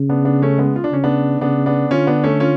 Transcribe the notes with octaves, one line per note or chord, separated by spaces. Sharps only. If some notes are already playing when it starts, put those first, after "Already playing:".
Already playing: C#3
B3 D4
B3 D4
A3 C#4
G#3 B3
F4
D4
C#3 C#4
B3 D4
C#3 B3 D4
B3 D4
D3 C#4 F4
B3 D4
A3 C#4
C#4 F4